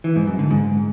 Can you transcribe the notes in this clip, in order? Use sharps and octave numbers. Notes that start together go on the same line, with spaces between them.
E3
G#2
F#2
D3
G#2